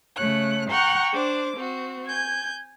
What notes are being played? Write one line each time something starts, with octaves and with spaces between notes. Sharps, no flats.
C#3 A3 C#5 F#6
F#5 G5 A#5 C#6 F6 F#6
D4 C5 D6
C4 F#4
G#5 G6 G#6